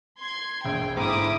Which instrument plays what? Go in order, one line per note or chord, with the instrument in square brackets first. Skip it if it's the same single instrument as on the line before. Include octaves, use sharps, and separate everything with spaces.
[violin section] C6 G#6
[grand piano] E1 A#1 [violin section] G5
[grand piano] G#2 D3 [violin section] E4 D6 D#6